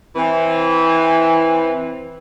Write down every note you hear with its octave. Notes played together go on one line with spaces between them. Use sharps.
E3 C4